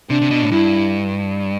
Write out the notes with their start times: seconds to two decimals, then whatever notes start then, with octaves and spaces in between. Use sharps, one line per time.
0.10 C3 D4
0.22 C3
0.31 B2
0.42 A2
0.51 G2 E4